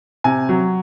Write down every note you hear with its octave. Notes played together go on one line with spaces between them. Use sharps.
C3 G#5
F#3